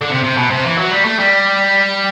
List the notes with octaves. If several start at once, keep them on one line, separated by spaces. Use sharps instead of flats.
D3
C3
C3
B2
C3
E3
F#3
G3
A3
G3